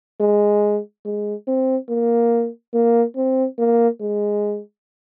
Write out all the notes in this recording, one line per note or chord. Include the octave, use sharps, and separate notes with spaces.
G#3
G#3
C4
A#3
A#3
C4
A#3
G#3